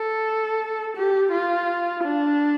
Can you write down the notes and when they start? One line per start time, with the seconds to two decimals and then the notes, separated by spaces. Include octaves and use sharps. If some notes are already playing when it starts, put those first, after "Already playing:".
Already playing: A4
0.96 G4
1.32 F4
2.04 D4